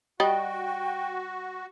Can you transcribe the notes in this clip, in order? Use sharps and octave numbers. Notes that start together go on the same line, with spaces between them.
G3 F#4 D5 D#5 G5